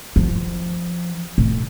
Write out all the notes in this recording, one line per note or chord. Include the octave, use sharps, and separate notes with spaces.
F3
A2